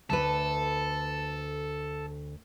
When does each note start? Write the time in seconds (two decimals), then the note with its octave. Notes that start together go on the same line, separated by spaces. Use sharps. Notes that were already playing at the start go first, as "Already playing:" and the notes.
0.10 D2 A3 A4 B4